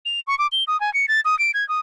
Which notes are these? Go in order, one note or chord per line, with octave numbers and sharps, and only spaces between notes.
F7
C#6
D6
G7
D#6
G#5
C#7
A6
D#6
D7
G#6
D#6